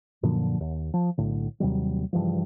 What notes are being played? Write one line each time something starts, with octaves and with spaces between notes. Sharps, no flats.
F#2 A#2 D3 F3
D#2
F3
B1 A2 D3
D#2 C3 F#3 G3
G2 C#3 E3 F3